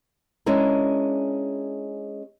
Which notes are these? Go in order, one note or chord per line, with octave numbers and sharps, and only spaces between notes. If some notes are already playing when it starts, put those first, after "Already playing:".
G#3 C#4 D4 E4 A#4